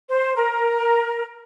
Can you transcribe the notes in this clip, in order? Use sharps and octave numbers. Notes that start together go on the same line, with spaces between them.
C5
A#4